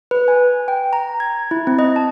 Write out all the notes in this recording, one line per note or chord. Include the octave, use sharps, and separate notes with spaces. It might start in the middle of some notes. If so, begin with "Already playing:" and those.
B4
G#5
G5
A#5
G#6
E4
C4
D#5
A5